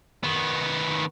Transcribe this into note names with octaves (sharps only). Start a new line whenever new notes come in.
D#3 B3